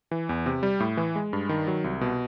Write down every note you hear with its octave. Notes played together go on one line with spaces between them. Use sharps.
E3
E2
C3
G3
A2
E3
G#3
G2
D#3
F#3
C2
B2